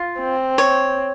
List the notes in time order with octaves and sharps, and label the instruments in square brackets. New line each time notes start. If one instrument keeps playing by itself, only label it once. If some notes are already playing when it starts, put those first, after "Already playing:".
Already playing: [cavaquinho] F4
[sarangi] C4
[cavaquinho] C#5